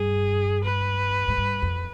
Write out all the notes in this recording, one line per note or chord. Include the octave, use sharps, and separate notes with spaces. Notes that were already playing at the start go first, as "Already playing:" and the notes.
Already playing: G2 G#4
B4
G#2
G2
F2